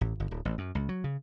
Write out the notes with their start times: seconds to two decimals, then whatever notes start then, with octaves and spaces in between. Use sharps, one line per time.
0.01 A1
0.20 G1
0.31 D1
0.45 A1
0.58 F#2
0.75 C#2
0.89 F#3
1.04 C#3